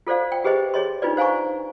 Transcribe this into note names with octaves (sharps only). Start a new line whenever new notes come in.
F4 A4 C5 D5 F5
G5
G4 G#4 B4 C5 D#5
G#4 C#5 D#5 C6
D4 D#4 F4 B4 D5
C5 F5 G#5 A#5 C#6